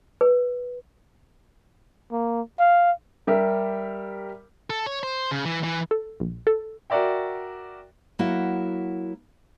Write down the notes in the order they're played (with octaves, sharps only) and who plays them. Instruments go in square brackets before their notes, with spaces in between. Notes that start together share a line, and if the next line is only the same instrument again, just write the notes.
[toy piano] B4
[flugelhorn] A#3
F5
[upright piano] G3 G4 A#4 E5
[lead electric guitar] A4
C#5
C5
C#3
E3
E3
[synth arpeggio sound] A4
A#1
A4
[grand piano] F#4 A#4 D5 E5 G5
[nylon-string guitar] F#3 A#3 E4 F#4 F#5